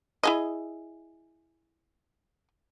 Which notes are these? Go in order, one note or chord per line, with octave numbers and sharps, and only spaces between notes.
E4 G#4 D#5